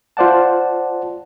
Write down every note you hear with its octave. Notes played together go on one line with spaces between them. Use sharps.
F4 C5 D5 F#5 A5